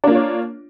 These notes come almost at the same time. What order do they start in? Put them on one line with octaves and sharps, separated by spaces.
D4 A#3 F4 C#5